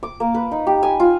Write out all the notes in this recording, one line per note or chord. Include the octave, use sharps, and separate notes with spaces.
D6
A#3
B4
D#4
G4
G#5
F4